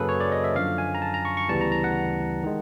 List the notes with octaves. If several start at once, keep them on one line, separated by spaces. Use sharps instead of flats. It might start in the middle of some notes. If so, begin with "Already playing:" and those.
Already playing: F#2 C#3 F#3 A#3 G#4 A4 B4
C#5
D5
D#5
E5
F#2 D3 F3 F5
G#5
A#5
A5
A#5
C#6
C#6
D2 C#3 E3 G3 B3 A5
A#5
A#5
F#5
D#3 G#3